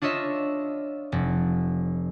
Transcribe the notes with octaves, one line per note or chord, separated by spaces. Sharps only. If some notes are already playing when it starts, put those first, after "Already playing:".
D4 F4 C#5 D#5 E5
F1